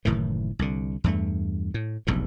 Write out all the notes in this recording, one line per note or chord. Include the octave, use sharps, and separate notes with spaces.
F#1 A2 D#3 E3
C2 D3
E2 G2 A3
A2
F1 B1 E2 G2